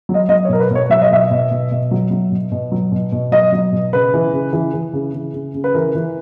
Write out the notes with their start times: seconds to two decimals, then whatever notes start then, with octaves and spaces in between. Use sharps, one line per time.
0.09 F#3
0.14 D#5
0.29 F#3 D#5
0.45 C#5
0.49 B2 A#4
0.60 B4
0.71 B2 C#5
0.90 F#3 E5
1.02 D#5
1.11 B2 E5
1.31 B2
1.51 B2
1.71 B2
1.91 F#3
2.11 F#3
2.32 B2
2.52 B2
2.72 F#3
2.92 B2
3.12 B2
3.32 F#3 D#5
3.52 F#3
3.72 B2
3.93 C#3 B4
4.14 E3
4.33 C#3
4.53 E3
4.74 E3
4.93 C#3
5.14 C#3
5.34 C#3
5.55 C#3
5.64 B4
5.74 E3 A#4
5.95 E3